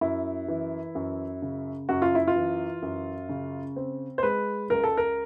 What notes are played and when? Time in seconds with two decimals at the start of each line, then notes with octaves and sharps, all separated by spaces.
0.01 F#2 E4
0.48 E3
0.95 F#2
1.42 C#3
1.89 F#2 F#4
2.02 F4
2.15 E4
2.28 F4
2.36 E3
2.83 F#2
3.29 C#3
3.76 C4
4.18 C5
4.23 G#3 B4
4.70 C#2 A#4
4.84 A4
4.97 A#4